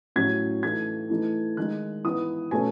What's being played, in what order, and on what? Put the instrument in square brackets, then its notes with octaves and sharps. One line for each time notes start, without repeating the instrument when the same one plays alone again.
[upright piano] A2 F#3 C#4 G#6
E3 A3 D#4 G#6
E3 A3 D#4
D#3 G#3 D#4 F#6
E3 B3 D#4 D#6
B2 A3 C#4 G#5